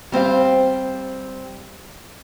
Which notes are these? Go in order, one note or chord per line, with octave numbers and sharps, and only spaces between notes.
G3 C4 C5 F5